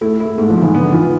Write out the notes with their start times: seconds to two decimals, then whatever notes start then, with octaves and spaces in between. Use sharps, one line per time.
0.01 A3 E4
0.20 A3 E4
0.38 G#2 A3
0.50 F3
0.57 G#2
0.62 E3
0.74 D3 B3
0.92 E3 F4